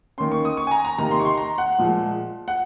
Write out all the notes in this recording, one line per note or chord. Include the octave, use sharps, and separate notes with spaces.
D#3 A#3 C#4 C6
C#6
D#6
C#6
G#5
A#5
A#5
C3 D#3 A#3 D#4 A#5
C6
C#6
C6
A#5
F#5
A#2 F3 G#3
F#5